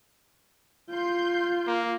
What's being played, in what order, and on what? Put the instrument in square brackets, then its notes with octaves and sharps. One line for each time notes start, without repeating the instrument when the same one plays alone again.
[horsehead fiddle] F4 [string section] C6 G6
[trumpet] A#3